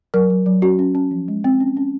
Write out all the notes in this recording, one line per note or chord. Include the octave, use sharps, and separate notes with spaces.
F#3 A#4
F#3
F#3
C#4 F#4
C#4
C#4
F3
G#3
C4
C#4
C#4